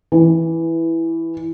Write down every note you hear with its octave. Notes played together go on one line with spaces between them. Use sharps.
E3